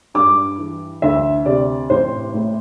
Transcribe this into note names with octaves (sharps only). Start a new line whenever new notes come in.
G2 D6
E3
D2 E5
C3 D5
A1 C5
A2